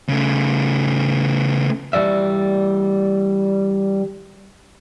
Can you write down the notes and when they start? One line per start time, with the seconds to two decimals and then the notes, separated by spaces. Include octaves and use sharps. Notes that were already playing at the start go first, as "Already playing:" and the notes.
0.09 C#3 A3
1.93 E3 G3 D5 E5